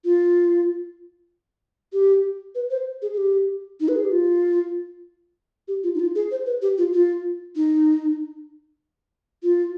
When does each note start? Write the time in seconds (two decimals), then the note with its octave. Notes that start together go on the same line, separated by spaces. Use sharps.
0.05 F4
1.93 G4
2.55 B4
2.70 C5
3.02 G#4
3.14 G#4
3.18 G4
3.81 D#4
3.88 B4
3.96 G#4
4.04 G4
4.11 F4
5.68 G4
5.84 F4
5.95 D#4
6.00 F4
6.15 G#4
6.31 C5
6.46 B4
6.62 G4
6.78 F4
6.93 F4
7.56 D#4
9.43 F4